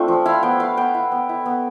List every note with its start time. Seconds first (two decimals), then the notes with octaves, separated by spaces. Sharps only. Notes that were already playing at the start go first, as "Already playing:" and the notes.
Already playing: A3 C4 D4 F4
0.08 F3
0.26 E4 F5
0.43 B3 G5
0.60 E4 F5
0.77 B3 G5
0.94 E4
1.12 B3
1.29 E4
1.46 B3